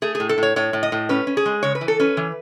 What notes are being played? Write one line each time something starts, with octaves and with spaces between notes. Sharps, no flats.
A3 G#4
G#4
A2
A4
A2 C#5
A2 C#5
A2
D#5
A2
C#4 B4
C#4
G#4
G#3
C#3 C#5
B4
E3
A4
C#4 B4
E3